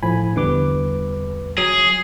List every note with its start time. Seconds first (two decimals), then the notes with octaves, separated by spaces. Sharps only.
0.02 A2 F3 G#5 B5
0.36 E2 D3 G3 B4 D6
1.58 F#3 G#4